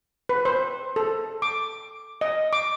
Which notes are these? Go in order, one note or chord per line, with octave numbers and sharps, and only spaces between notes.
B4
C5
A4
D6
D#5
D6